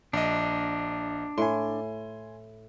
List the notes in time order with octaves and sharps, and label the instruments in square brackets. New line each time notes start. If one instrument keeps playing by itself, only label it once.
[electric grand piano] A#1 D#5 [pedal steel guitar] D4
[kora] A2 [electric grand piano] G#5 C6